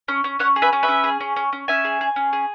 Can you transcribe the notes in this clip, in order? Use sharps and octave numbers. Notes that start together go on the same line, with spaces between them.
C#4
C#4
C#4 C#5 F#5
G#4
B4 E5
C#4
B4 E5
C#4
G#4
C#4
C#4
C#4
C#4 E5 G#5
G#4
G#4
C#4
G#4